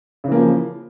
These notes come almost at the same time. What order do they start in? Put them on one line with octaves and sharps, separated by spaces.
C#3 E3 A#3 F3